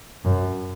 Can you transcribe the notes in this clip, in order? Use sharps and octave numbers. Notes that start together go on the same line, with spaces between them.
F#2